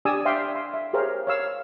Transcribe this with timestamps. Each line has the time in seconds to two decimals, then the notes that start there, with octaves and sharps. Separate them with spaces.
0.05 D4 G4 D5 G#5 D#6 E6
0.25 D5 E5 F5 G5 C6
0.56 C6
0.74 E5
0.93 G4 G#4 A#4 C5 C#5 F5
1.27 C#5 F5 E6